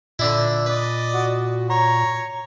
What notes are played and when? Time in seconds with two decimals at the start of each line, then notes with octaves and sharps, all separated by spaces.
0.19 A#2 D3 D4 E4
0.66 B4 D5 D#5
1.14 F#4
1.70 C#5 A#5